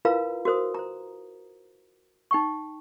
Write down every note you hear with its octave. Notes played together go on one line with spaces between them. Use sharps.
E4 F4 A#4 B4 F5 A#5
F#4 A#4 C5 D#6
C5 A#5
D#4 G5 C#6